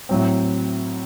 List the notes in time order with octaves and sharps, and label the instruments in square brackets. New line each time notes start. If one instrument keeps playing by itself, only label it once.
[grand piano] A2 F#3 C4